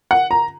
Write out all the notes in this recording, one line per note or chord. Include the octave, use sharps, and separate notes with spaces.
F#5
A#5